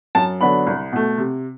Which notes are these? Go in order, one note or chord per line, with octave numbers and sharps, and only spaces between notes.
F#2 A5
D3 F#3 B3 D4 B5
C2
B2 A3
C3